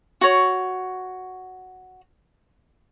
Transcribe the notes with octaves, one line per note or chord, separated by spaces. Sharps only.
F#4 C#5